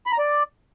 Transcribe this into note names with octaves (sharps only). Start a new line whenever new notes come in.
B5
A#5
D5